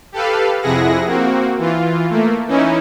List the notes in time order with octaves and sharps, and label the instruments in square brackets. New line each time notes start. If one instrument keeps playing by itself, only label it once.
[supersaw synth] G4 A4 B4 F5
F2 C3 E4 G#4 F#5 A#6
A#3 C4 F#4
E3 F4
A3 A#3
E3 C#4 D#4 E4